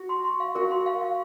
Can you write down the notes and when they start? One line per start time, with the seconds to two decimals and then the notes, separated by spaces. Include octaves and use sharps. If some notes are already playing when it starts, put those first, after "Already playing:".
Already playing: F#4
0.09 C6
0.24 C6
0.40 F5
0.55 F#4 A#4
0.71 C6
0.86 F5
1.01 F5